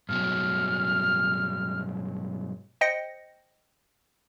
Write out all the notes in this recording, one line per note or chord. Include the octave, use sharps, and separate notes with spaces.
G2 B2 F#3 F6
C5 D#5 G5 A#6 C#7